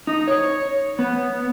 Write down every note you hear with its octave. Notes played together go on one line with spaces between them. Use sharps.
D#4
C#5
B3